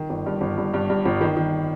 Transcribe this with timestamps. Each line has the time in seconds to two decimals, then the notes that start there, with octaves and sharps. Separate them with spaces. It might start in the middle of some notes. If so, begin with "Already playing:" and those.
Already playing: D#3
0.09 G1
0.26 G2
0.41 G1
0.57 G2
0.73 G2
0.89 G2
1.05 G1
1.21 D#3
1.37 D#3